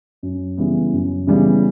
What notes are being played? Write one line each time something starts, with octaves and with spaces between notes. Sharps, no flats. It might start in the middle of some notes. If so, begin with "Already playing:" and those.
F#2
C#3 E3 G3 B3
F#2
C#3 E3 G3 B3